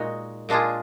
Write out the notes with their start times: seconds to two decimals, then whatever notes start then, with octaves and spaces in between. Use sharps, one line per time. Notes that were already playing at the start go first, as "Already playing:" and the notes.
Already playing: A#2 G#3 D#4 F#4
0.49 A#2 G#3 D4 F4 G#4